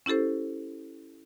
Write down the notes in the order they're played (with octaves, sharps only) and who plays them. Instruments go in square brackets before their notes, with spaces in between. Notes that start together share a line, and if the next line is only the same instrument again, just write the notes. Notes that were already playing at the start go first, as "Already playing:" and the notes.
[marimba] C#4 E4 G4 A4 C5